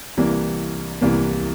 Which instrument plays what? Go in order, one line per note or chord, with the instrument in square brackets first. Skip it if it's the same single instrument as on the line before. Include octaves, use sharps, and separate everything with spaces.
[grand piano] C2 C3 E3 A#3
C2 C3 E3 A#3